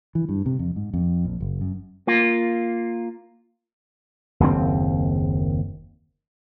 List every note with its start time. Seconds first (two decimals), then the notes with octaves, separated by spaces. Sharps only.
0.15 E3
0.29 G2
0.46 C3
0.59 F2
0.76 G#2
0.94 F2
1.25 A#1
1.41 F#1
1.61 F#2
2.07 A#3 F4
4.40 F#1 D#2 C3 C4